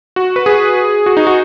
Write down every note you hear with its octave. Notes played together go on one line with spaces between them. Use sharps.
F#4
B4
G#4
F#4
D#4
F#4